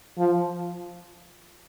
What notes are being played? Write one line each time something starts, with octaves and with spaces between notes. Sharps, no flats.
F3